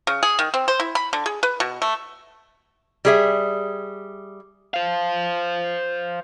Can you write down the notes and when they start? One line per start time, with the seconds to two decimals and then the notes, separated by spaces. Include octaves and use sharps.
0.07 C#3
0.23 G#4
0.39 D#3
0.54 C4
0.68 C5
0.80 E4
0.95 B5
1.13 D3
1.26 G#4
1.43 B4
1.60 B2
1.82 A3
3.05 G3 G#4 E5
4.74 C5 F5